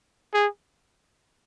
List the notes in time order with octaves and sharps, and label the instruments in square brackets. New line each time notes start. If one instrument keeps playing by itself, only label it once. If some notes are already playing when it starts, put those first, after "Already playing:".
[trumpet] G#4